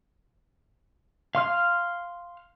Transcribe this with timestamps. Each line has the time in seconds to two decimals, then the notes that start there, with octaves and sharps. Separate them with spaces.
1.35 F5 C6 F6